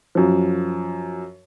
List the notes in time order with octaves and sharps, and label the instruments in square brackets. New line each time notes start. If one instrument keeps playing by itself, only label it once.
[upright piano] F#2 F3